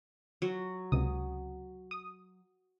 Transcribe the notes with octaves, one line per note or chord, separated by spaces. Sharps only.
F#3
C#2 C3 D#6
D#6